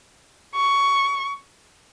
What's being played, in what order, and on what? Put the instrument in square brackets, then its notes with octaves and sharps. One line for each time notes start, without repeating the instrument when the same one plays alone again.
[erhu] C#6